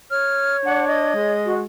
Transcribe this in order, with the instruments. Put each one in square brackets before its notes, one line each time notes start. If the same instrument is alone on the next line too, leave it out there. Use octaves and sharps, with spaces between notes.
[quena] C#5 [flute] F6
[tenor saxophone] D4 [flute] F#5
[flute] D#5
[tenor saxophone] G#3
[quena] F#4